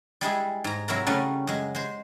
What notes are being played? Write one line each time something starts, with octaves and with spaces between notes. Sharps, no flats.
G3 G#3 E4 G#4
G#2 A#5
C3 F#3 E4 F#4 A#4 A#5
C#3 G3 A3 C#4 F#5 A#5
F#2 G#3
G#3 C5